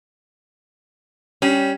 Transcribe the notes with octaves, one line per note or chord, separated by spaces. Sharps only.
G3 C#4